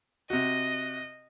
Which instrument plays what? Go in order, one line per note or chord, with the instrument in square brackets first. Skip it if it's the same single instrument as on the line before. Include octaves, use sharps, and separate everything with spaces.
[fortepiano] C3 F#4 [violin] D#5